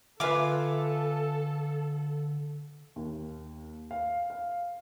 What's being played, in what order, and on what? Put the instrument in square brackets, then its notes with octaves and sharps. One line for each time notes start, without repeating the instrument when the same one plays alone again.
[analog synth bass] D3 [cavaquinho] F4 G#5 D6 [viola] A4 [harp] B4 E5 F5
[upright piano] D#2
F5
F5